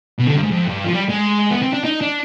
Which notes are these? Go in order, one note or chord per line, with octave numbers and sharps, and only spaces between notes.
B2
D3
G2
G#2
F2
G2
F3
G3
G#3
B3
C4
D4
D#4
D4